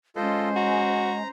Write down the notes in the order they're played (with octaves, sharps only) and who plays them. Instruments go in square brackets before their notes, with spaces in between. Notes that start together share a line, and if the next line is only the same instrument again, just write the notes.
[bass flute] G#3 [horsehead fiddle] C#4 C5 [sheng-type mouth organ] F4 A4 D#5
[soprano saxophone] F#4 [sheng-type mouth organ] A#5